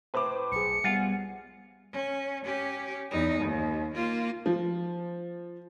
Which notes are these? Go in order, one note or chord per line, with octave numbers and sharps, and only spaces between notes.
A2 B4 C5 D6
B1 G#4 C#7
G3 B3 F4 F#5 G#5
C#4
C#4 G4
E2 D#4
D#2
A#3 F4
F3